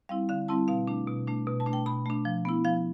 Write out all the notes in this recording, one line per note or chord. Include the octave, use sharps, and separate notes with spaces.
G3 C4 E4 F5
D3 F5
G3 C4 E4 A5
B2 F5
A3 D4
B2
A3 D4
B2
A5
A3 D4
G5
B2 B5
A3 D4
F3
B3 E4
F3 F5